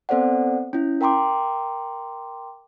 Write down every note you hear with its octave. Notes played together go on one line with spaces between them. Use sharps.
B3 C4 A4 C5 D5 F#5
C#4 E4
A#4 G5 A#5 C6 D6